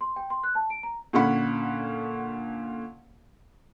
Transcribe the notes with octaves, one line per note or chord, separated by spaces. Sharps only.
C6
G5
C6
F#6
A5
D7
A#5
A#2 D3 C#4 F#5 B5